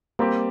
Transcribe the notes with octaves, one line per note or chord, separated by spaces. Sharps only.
G3 A#3 C4 G4